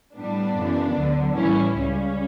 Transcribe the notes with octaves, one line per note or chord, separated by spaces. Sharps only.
A2 G3 B3 D4
F#2 C#3 E3
D2 D3 F#3
A2 E3 G3 C#4 E4
C#2 C#3 G3 C#4